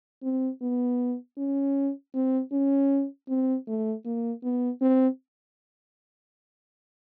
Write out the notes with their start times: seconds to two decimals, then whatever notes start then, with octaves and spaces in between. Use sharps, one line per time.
0.23 C4
0.62 B3
1.38 C#4
2.14 C4
2.52 C#4
3.29 C4
3.67 A3
4.06 A#3
4.43 B3
4.81 C4